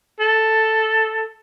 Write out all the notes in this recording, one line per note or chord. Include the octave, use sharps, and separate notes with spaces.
A4